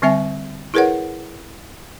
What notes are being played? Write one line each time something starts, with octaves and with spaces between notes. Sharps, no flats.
D3 G3 C4 E5 G#5
E4 G#4 A#4 B4 C#5 F#5